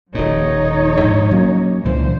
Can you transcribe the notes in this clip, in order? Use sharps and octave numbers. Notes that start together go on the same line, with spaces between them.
D#1 A#2 F3 D#4 C#5
G#2
F#3 A#3 C#4
C#2 A#2 D3 E3 C5